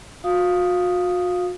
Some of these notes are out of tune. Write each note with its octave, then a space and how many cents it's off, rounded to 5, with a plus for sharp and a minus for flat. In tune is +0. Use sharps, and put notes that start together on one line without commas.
F#4 -40 F5 +0 D#6 +0